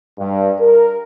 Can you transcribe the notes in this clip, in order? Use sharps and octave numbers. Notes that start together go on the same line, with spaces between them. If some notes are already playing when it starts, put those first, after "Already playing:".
G2
A#4